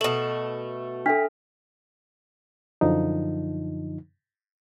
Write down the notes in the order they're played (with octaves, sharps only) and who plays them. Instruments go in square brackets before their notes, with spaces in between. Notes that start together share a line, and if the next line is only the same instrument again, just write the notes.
[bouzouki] B2 A3 [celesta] A4 E7 F#7
[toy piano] D4 [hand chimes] A4 E5 F6 [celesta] G5 B6
[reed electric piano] F#2 D3 F3 D#4